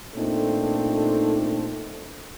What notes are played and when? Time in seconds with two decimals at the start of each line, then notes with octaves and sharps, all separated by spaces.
0.15 A#2 A3 C4 D4 D#4 A4